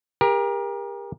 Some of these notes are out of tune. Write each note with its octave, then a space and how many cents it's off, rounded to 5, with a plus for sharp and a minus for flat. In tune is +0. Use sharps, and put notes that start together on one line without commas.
G4 +40 A#4 +25